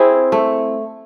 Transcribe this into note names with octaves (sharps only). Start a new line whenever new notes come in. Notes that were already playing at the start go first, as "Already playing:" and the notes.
Already playing: C4 E4 G#4
A3